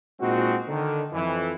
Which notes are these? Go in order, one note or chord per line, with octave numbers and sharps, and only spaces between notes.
A#2 G#3 C4 D#4 F#4
D3 D#3
F2 E3